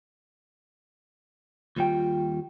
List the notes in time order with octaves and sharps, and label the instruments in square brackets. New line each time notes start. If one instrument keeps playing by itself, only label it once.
[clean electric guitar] D#2 G3 G5 [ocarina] F4